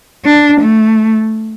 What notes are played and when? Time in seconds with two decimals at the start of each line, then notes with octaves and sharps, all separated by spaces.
0.25 D4
0.61 A3